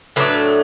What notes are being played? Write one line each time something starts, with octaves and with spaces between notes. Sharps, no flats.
A2 F#3 A3 D4 B4